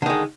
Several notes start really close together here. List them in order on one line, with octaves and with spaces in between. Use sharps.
D3 D#3 G#3